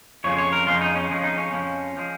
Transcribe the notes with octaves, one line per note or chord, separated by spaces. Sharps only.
F2 C#3 F3 G#3 C#5
C#5
A#4
F2 C#3 F3 G#3 F4
D#4
C#4
F2 C#3 F3 G#3 C#4
D#4
C#4
F2 C#3 F3 G#3
F3 G#3